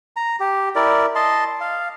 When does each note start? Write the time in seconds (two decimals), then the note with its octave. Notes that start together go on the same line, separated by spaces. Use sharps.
0.16 A#5
0.40 G4
0.76 E4 A#4 D5
1.15 D#5 A5 C6
1.61 F5